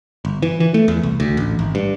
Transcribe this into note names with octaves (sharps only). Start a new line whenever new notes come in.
G1
E3
E3
A3
E2
C2
D2
A1
G#1
G2